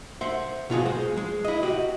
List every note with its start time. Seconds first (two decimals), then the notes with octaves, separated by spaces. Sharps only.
0.21 C5 E5 F#5
0.70 B2 F4 F#4 G#4
0.85 G#3 C5
1.17 G#3
1.45 E4 D#5
1.63 F#4 G4 D#5